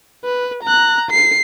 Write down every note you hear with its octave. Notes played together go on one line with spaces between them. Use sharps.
B4
A#5 F#6
C7